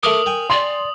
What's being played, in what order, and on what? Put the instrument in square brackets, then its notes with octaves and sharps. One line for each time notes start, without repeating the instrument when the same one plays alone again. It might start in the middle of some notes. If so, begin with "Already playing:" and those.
[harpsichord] A3 D6 [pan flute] A#4 [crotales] D#6 F#7
[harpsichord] G5 G#5
[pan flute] D5 [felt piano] C6